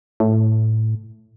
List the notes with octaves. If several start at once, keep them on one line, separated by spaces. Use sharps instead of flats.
A2